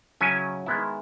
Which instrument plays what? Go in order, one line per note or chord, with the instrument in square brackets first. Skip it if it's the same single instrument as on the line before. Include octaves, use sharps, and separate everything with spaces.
[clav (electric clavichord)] C#3 F#3 C#4 E4 G#5
D#3 G#3 B3 E4